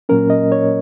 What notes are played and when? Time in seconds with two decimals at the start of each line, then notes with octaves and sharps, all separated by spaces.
0.09 A#2 F#3 A#3 C#4 A#4
0.30 D#5
0.52 C#5